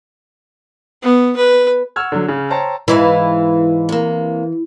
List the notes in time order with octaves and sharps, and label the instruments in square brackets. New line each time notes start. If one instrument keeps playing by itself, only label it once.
[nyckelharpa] B3
B4
[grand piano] F#5 C#6 E6 F6 G#6
D3 F#3
C#3
C5 C#5 G5 A5 A#5
[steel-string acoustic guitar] G#2 G#3 F5 [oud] E3
[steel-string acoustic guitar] C3 A#3